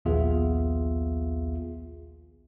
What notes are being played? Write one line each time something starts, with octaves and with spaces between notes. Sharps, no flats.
A#1 D#2 B3 F4 G#4 E5